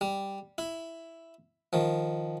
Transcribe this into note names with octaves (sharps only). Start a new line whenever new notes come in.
G3
E4
D#3 F3